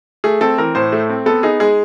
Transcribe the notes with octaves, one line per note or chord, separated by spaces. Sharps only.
A3 G#4
C4 A4
E3 A#4
A2 C5
A3
C4
B3 A4
D#4 G#4
G#3 G#4